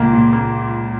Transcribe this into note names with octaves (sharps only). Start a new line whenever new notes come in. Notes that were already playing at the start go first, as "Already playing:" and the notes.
Already playing: C#2 A#2 A#3
A#2
A#3